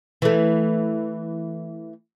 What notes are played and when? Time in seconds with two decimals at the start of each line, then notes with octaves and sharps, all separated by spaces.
0.22 E3 A3